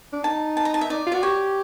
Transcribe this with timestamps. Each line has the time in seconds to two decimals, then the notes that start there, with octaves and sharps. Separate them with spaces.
0.13 D4
0.24 D#4 A5
0.57 A5
0.65 A#5
0.74 A5
0.81 E5
0.90 D#4 D5
1.07 F4
1.12 F#4 D5
1.23 G4 C#5